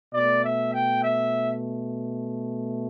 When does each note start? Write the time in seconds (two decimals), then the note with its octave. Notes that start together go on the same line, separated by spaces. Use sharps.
0.13 B2 A3 D5
0.43 E5
0.73 G5
1.02 E5